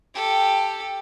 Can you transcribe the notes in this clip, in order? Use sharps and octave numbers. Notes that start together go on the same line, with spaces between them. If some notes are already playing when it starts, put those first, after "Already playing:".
G4 A4